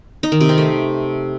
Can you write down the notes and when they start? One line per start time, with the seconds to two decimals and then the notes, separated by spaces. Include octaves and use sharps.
0.23 D#4
0.32 D#3
0.40 C3
0.49 C4
0.58 A3